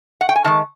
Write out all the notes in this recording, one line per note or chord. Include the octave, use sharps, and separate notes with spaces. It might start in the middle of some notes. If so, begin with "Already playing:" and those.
F#5
G5
G#5
F#2 D#3 G#3 A5